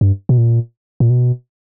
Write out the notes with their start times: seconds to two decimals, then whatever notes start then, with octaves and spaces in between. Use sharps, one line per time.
0.01 G2
0.29 B2
0.38 A#2
1.00 A#2
1.10 B2